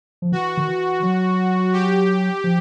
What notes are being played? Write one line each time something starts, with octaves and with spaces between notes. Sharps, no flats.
F3
E3 F#4
D#3
E3
F#3
G4
F3